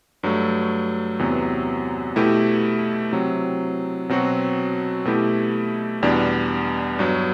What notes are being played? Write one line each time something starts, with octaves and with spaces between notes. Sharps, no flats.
G2 F#3 A3
E2 C3 F#3 B3
B2 A3 E4 G4
C3 F#3 C4
B2 F#3 C4 F#4
B2 A3 E4 G4
E2 B2 G3 B3 D4
G2 F#3 B3